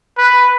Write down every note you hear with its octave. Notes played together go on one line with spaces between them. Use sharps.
B4